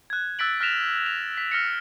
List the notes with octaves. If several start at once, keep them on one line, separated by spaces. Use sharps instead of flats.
F#6 G#6
E6 F#6 A6 B6 D7 F#7
F6 F#6 A#6 B6 E7 F7
F7
B6
F6 A#6 C#7